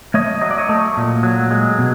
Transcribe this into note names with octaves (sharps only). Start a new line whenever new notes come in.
A3 C#5 D#5
F#3 D#5
D5
C#5 D#5
A3
A#2
F#3
G#3
B2